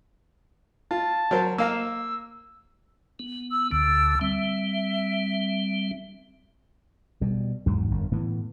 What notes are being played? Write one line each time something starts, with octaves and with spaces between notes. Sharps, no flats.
F4 A5
F#3 A#4 C5
A#3 F5 A#5 E6
B3
E6
D2 D3 E6
G3 C4 E5
B2 G3
E2 G#2 F#3
G1 F#2
A2 E3 B3